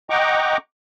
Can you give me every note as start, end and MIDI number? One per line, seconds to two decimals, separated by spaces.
0.10 0.57 75
0.10 0.57 78
0.10 0.57 79
0.10 0.57 82
0.10 0.57 85
0.10 0.57 86